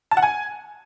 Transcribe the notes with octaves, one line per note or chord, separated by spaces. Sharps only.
A5
F#5
G#5